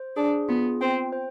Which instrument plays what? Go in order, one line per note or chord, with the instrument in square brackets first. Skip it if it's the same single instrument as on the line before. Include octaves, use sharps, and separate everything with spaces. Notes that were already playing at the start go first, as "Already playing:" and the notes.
Already playing: [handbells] C5
[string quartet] D4 [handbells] G#4
[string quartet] B3 [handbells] F4
[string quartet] C4 [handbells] G5
[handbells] C5